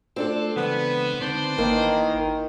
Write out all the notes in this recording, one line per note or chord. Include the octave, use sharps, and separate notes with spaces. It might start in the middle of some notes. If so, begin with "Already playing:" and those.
A3 C4 D4 F4 F#4 A4
C#3 E3 G#3 B3
D3 C4 D4 D#4 B4 C5
G#1 D#3 E3 A#3 A#4 D#5